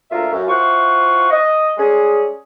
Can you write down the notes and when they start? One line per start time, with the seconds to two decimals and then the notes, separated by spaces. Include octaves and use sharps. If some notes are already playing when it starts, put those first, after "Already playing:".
0.11 D2 A#2 F4 A#4 E5
0.32 F#2
0.48 E4 F4 C5 F#5 C#6
1.31 D#5
1.77 G3 G#3 C#4 G#4